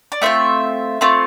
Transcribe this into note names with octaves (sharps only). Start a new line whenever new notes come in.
D5
A3 C4 F4 E5
A3 C4 F4